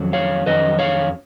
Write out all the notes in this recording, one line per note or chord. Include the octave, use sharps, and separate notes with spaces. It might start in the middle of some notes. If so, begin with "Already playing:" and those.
Already playing: F2 D#3 F#3 C#4
C#5 F5
F2 D#3 F#3 C#4 B4 D#5
C#5 F5